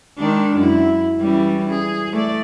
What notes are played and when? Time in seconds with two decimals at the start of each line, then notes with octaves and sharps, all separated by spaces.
0.18 D#3 G#3 D4
0.58 F#2 E4
1.20 E3 G3 C#4
1.69 G#4
2.13 A3 D5